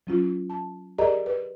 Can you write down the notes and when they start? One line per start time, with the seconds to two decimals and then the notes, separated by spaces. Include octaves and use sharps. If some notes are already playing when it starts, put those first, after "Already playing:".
0.07 F#3 C#4 F4
0.50 A5
0.98 G4 G#4 A#4 D5 D#5 A#5
1.26 B4